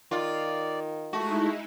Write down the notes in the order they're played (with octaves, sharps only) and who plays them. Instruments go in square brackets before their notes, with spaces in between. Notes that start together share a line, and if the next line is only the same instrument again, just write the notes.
[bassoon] D#3 [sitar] F4 [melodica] D5
[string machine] G#3 D#4 E4 [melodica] A3 [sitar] F#4